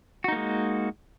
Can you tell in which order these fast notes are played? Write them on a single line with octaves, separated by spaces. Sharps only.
F#4 D#4 A#3 G#3